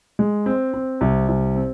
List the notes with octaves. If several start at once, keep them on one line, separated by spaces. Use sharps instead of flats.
G#3
C4
C4
C2
C2
C4